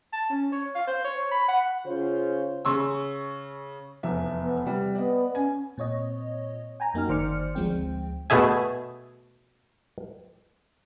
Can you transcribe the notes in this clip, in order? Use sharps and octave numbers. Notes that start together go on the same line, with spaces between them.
A5
C#4
C#5
F5
C5
C#5
B5
F#5
C#3 F4 C5 C#5
C#3 C#6 E6
F1 E2 E5
B3
C3 G3
B3 D5 D#5
C#4 G#5
A#2 C4 C#5 D#5
G5 G#5 A#5
F#2 A#3 D#4 F#4 F6
G1 D#3 C5 D5 F6 C#7
D2 F3 G#3 C4 G5
B2 A3 G#4 E5 G#5